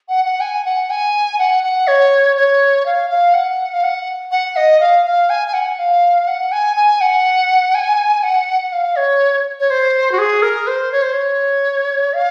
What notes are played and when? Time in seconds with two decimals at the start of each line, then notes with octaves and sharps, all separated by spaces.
0.09 F#5
0.25 F#5
0.40 G#5
0.65 F#5
0.90 G#5
1.39 F#5
1.63 F#5
1.87 C#5
2.37 C#5
2.86 F5
3.10 F5
3.34 F#5
3.73 F5
3.83 F#5
4.31 F#5
4.56 D#5
4.80 F5
5.06 F5
5.30 G#5
5.48 G#5
5.54 F#5
5.79 F5
6.28 F#5
6.52 G#5
6.77 G#5
7.01 F#5
7.75 G#5
8.23 F#5
8.72 F5
8.96 C#5
9.60 C#5
9.70 C5
10.12 F#4
10.18 G#4
10.42 A#4
10.67 C5
10.92 C#5
11.02 C5
11.13 C#5
12.13 F5